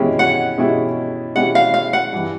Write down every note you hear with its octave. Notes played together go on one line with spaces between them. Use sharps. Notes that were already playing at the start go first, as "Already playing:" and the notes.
Already playing: B2 G#3 C#4 E4 G4
F#5
B2 G#3 C#4 E4 G4
B2 G#3 C#4 E4 G4 F#5
F5
F5
F#5
G2 E3 G3